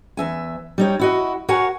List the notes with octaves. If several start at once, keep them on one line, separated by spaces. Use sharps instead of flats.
E2 E5 G#5
G3 D#4 C#5
E4 F#4 D#5
F#4 A#4 C#5 F#5 G#5